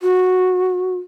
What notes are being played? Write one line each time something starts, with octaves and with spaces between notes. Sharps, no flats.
F#4